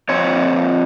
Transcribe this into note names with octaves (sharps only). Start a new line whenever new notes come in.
F2 C4 C#5